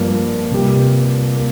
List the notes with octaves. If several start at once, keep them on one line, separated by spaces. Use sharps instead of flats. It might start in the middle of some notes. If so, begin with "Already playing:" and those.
Already playing: G2 F3 A#3
C3 G3 A#3 G4
A#3